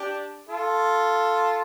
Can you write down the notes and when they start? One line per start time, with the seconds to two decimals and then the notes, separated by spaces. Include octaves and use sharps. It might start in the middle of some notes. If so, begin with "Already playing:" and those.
Already playing: D4 G4
0.49 F4 A4